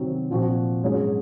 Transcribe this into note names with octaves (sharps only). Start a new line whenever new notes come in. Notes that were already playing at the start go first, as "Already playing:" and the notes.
Already playing: C3 D#3 F#3 C4
A#2 F3 C4 F#4
G#2 F#3 C#4 G#4 C#5